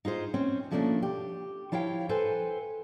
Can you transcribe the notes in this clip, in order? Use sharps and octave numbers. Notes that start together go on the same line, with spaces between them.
D#4 F4 G#4 C5
C4 C#4
B2 F3 A3 A#3 C#4 D4
G4
F3 E4 C#5 F5 G5
A4 B4 C5 G#5